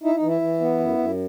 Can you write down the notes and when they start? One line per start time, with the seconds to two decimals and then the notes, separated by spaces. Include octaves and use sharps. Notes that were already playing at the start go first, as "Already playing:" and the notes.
0.03 D#4 E4
0.15 D#4
0.22 E3
0.27 E4
0.41 E3
0.60 B3
0.79 F#2
0.98 F#2